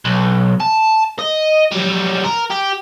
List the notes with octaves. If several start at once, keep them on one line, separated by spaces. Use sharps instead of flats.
B1
A5
D#5
F#3 G3
A#4
G4